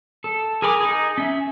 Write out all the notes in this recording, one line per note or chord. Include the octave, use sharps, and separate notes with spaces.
A4
G#4 A#4 G#5 B5 D6
D#4 G#4
C#4 E5